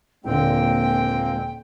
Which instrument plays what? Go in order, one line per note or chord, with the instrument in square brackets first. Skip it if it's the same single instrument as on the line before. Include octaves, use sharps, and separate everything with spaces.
[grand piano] D#1 A#2 D3 [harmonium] G#3 A#3 C4 [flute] G5